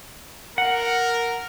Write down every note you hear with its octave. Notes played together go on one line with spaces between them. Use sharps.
A#4 F#5